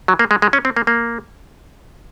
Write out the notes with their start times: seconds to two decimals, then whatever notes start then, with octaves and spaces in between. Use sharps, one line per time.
0.08 F#3
0.19 A#3
0.31 G#3
0.42 G#3
0.53 C#4
0.65 C4
0.77 A#3
0.87 A#3